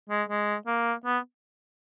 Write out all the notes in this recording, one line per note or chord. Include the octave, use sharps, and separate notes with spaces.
G#3
G#3
A#3
B3